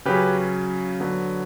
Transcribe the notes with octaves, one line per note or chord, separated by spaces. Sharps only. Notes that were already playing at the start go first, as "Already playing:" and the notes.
C#3 F#3 C#4 G4 B4
D3 F#3 B3